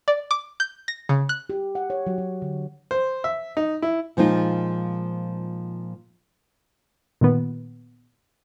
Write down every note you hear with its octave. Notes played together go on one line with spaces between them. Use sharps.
D5
D6
G6
A#6
C#3
F#6
G4
F#5
C#5
F#3
F#3
D3
C5
E5
D#4
E4
A#2 F3 G#3 D#4 F4
A#2 D#3 B3